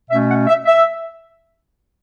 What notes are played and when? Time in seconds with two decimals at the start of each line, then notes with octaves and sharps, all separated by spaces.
0.10 B2 A3 C#4 E5
0.28 F#5
0.47 E5
0.66 E5